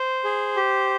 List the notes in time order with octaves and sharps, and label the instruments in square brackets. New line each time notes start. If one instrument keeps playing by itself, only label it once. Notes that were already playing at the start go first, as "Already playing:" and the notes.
Already playing: [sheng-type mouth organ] C5
G#4
G4